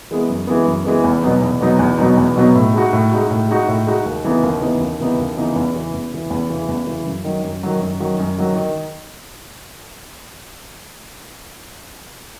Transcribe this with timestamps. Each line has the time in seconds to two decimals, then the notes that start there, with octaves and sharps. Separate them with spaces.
0.11 E3 G#3 B3
0.29 F#2
0.47 E3 G#3 B3
0.67 F#2
0.85 E3 G#3 B3
1.04 E2
1.22 B2 F#3 B3 D#4
1.41 E2
1.61 B2 F#3 B3 D#4
1.79 E2
1.98 B2 F#3 B3 D#4
2.17 E2
2.36 B2 F#3 B3 D#4
2.55 A2
2.74 G#3 D#4 F#4
2.93 A2
3.11 G#3 D#4 F#4
3.31 A2
3.48 G#3 D#4 F#4
3.68 A2
3.87 G#3 D#4 F#4
4.06 D#2
4.24 C#3 E3 B3 D#4
4.43 D#2
4.61 C#3 E3 B3 D#4
4.80 D#2
5.00 C#3 E3 B3 D#4
5.18 D#2
5.37 C#3 E3 B3 D#4
5.56 E2
5.75 C#3 E3
5.94 E2
6.12 C#3 E3
6.30 E2
6.50 C#3 E3
6.68 E2
6.87 C#3 E3
7.06 F#2
7.24 D#3 F#3
7.43 F#2
7.63 D#3 F#3
7.81 F#2
8.00 D#3 F#3
8.19 F#2
8.38 D#3 F#3
8.56 D#3